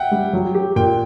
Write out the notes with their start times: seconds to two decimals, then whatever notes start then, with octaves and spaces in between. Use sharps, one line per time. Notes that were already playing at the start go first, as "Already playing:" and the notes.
Already playing: E5 F#5 G5
0.11 G3
0.33 F#3
0.54 G4
0.76 A#2 G5